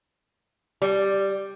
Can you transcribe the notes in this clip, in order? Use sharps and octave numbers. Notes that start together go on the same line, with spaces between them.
G3